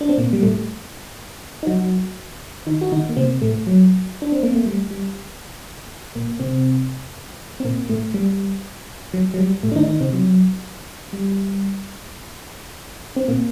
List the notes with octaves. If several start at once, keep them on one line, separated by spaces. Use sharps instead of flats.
D4
C4
A#2 A#3
G3
A2 A3
D#4
F#3 F#4
D#3 D#4
F#4
D#3 D#4
A#3
C3 C4
A2 A3
F#3
D4
C4
A#3
A3
G3
G3
A#2 A#3
C3 C4
C4
A#2 A#3
A2 A3
G3
F#3
F#3
G3
A2 A3
D4
D#3 D#4
D#3 D#4
C3 C4
F#3
G3
C4
A#2 A#3